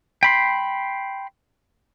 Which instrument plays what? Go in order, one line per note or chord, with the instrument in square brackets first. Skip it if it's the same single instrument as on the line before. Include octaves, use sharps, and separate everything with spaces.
[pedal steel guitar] G5 B5 C6